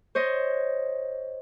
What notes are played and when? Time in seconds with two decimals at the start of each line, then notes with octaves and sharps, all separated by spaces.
0.15 C5 C#5 D#5